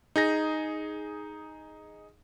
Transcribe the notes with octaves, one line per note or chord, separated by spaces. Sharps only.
D#4 G#4 A#6